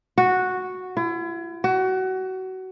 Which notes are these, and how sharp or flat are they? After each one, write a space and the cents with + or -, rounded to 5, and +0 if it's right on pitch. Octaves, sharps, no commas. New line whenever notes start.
F#4 -5
E4 +40
F#4 +25